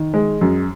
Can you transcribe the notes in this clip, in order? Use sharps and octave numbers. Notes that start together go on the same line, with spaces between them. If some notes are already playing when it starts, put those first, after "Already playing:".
Already playing: D#3
G#3
F#2